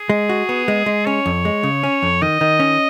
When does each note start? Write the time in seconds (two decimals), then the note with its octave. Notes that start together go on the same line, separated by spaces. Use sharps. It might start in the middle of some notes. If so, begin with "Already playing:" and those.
Already playing: G#4
0.10 G#3
0.29 F#4
0.49 B3
0.68 G#3
0.86 G#3
1.06 C#4 C#5
1.26 F2
1.45 G#3
1.63 C#3
1.83 C#4
2.03 F2
2.22 D#3 D#5
2.41 D#3
2.60 C#4